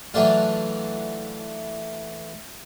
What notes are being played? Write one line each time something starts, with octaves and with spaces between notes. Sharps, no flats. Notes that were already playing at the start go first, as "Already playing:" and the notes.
E3 F#3 A3 D4 F4